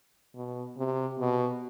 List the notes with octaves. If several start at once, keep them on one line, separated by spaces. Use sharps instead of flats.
B2
C3
B2